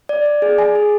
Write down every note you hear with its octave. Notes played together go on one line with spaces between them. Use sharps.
D5
D5
G#4
G#5
G#4